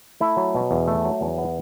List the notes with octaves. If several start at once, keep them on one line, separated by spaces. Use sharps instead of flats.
A3 E4
F#3
B2
E2
A3
F#3
E2
B3